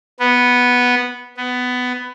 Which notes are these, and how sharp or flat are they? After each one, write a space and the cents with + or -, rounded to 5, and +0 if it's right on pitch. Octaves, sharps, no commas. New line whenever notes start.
B3 -5
B3 +15